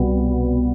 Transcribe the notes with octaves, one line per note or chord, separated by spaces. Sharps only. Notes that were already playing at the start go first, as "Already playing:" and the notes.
Already playing: C2 B2 G3 B3